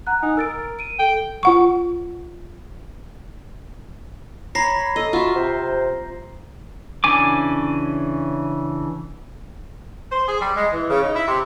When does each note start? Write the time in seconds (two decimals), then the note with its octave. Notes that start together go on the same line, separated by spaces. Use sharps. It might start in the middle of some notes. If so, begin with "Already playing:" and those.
0.07 F#5 A#5 F#6
0.23 D#4 G#5
0.37 A#4 E6 A6 D7
0.79 D7 D#7
0.99 A4 G5
1.43 F4 F#5 C#6
4.55 C#5 A#5 B5 A#6 C7
4.96 A4 D#5
5.13 F4 F#4 E5 B5
5.35 C3 C5
7.04 C#3 E3 D4 G#5 D6
10.11 C5
10.28 G#4
10.41 G3
10.56 G#3
10.72 E3
10.90 C#3
11.03 D#4
11.15 E4
11.27 C3